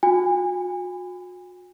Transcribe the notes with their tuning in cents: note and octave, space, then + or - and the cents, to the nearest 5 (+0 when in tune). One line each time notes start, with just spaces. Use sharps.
F#4 -40 G#5 -35